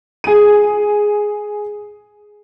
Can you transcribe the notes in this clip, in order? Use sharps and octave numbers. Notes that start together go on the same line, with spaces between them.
G#4 D#7